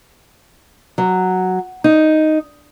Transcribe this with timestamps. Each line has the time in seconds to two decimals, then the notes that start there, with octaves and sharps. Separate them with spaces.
0.98 F#3
1.84 D#4